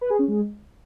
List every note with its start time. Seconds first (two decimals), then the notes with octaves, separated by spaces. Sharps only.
0.01 B4
0.10 G#4
0.19 C#4
0.28 G#3